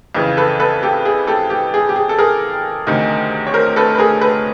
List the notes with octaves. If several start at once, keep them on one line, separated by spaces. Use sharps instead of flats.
F2 C#3 E3
A4 B4
A4 B4
G4 A4
G#4
G4 A4
G4
G#4
G4
G#4
A4
G#4 A#4
D2 C3 D#3
C#5
A#4 C5
A4 B4
B4
G#4 A#4
A4 B4